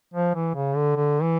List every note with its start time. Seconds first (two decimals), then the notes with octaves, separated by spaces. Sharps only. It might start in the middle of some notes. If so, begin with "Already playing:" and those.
0.14 F3
0.35 E3
0.55 C#3
0.76 D3
0.96 D3
1.23 E3